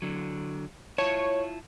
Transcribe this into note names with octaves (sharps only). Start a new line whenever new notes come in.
D3 F#3
E4 F4 C#5 A5